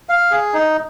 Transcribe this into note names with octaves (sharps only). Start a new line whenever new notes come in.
F5
G#4
D#4